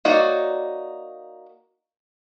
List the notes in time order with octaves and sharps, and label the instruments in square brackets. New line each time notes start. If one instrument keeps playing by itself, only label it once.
[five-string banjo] A#3 D#4 F#4 C#5 D5